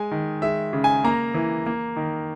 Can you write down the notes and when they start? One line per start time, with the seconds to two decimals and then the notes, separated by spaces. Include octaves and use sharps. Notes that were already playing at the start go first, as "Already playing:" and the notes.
Already playing: G#3 G#5
0.11 D#3
0.42 G#3 E5
0.73 C#3
0.84 G#5
1.04 A#3 A#5
1.34 E3
1.66 A#3
1.96 D#3